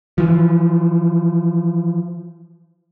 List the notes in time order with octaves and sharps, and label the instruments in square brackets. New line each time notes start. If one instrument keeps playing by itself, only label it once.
[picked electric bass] E3 F3